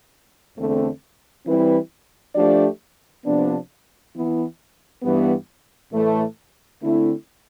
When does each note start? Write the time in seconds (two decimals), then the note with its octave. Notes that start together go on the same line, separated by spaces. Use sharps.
0.57 E2 D3 A3 C4
1.46 E3 G3 C4 E4 B4
2.35 F3 A3 D4 G4 D5
3.24 C3 F3 B3 D4
4.14 E3 B3 E4
5.02 G2 E3 G3 B3
5.91 A2 E3 A3
6.80 D3 A3 C4 E4